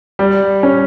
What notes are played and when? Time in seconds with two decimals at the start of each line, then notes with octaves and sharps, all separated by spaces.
0.19 G3
0.63 C#4